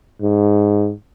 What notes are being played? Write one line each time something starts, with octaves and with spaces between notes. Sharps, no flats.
G#2